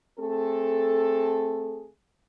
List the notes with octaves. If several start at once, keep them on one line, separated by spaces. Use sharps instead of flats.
A3 C4 G#4 A4